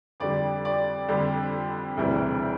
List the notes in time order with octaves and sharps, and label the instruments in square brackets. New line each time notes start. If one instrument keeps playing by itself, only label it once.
[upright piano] F2 D3 G3 D5
D5
F2 D3 G3
E1 D2 C3 E3 G3